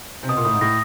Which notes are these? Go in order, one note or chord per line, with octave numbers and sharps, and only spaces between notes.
C3
B2 D#6
A#2
A2 D#6
G#2
A2 A#6